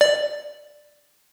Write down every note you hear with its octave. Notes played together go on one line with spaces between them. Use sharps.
D5